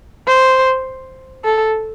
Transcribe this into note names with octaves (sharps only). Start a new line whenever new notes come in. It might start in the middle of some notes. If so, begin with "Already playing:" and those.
C5
A4